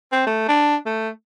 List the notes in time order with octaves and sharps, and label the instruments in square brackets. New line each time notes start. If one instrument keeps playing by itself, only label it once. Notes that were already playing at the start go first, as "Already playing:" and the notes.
[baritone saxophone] C4
A3
D4
A3